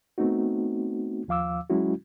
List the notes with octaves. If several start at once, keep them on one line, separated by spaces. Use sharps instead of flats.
A3 B3 C4 D#4 F#4
D#2 F3 F5 D6 E6
F#3 G#3 C#4 E4 F#4